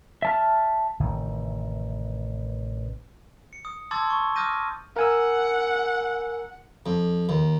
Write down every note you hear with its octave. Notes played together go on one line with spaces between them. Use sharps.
E5 A5 F6
A1 C3 D#3 E3
C#7
D#6
A5 C6 D6 E6 G#6 A6
C#6
D6 D#6 F6 G6 A#6 D#7
A#4 F#5 G#5 E6
F2
D#2